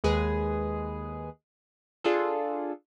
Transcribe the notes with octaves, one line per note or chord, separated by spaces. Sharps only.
D#2 G#3 G#4 B4
D4 F4 G#4 A4